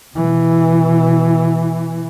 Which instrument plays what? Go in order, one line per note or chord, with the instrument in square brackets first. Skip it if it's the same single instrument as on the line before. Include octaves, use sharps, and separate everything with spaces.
[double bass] B2 E3